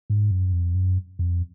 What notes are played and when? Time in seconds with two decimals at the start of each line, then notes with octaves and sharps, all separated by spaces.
0.10 G#2
0.31 F#2
0.52 F2
0.75 F#2
1.19 F2